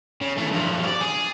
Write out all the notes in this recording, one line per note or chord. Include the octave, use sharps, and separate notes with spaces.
C#3
E2 A3
G2 F3
C#5 D5
G#4